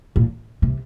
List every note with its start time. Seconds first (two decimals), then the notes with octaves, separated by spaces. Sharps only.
0.16 A#2
0.62 C3